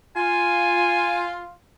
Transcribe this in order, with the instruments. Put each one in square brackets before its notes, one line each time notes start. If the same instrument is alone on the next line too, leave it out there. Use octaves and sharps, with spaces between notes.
[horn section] F4 [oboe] G#5